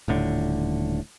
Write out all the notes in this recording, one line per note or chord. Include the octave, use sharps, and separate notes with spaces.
D#1 A2 D3